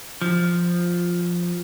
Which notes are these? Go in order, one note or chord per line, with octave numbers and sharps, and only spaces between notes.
F3